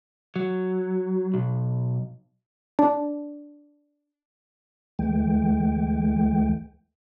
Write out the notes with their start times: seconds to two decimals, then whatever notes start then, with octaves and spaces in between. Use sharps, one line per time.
0.36 F#3
1.34 B1
2.79 D4
4.99 D2 E3 G#3 A3 G5